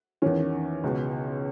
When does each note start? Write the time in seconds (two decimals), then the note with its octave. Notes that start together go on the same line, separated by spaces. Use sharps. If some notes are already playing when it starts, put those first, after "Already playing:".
0.22 E2 D#3 C#4
0.84 C#2 B2